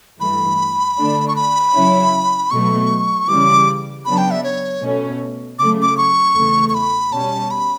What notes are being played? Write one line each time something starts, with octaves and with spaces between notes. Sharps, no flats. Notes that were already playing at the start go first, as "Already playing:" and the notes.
G2 E3 A3 B5
D3 A3 D4
C#6
B5
C#3 F#3 C#4 E4
B2 F#3 A3 C#6
C#3 E3 G3 D6
C#3 F#3 B3 D4 B5
G5
E5
C#5
B2 A3 C#4
C#3 F#3 A3 D6
D6
C#6
E2 C#3 E3 A3
C#6
B5
B2 G3 C#4 A5
B5